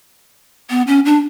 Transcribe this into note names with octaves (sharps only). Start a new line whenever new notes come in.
B3
C#4
D4